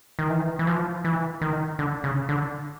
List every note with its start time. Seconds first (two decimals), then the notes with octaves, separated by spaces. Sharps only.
0.19 D#3
0.30 E3
0.59 E3
0.67 F3
1.04 E3
1.41 D#3
1.79 D3
2.04 C#3
2.29 D3